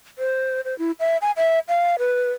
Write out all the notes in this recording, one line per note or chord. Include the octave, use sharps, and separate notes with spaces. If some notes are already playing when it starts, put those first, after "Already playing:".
C5
C5
E4
E5
G#5
E5
F5
B4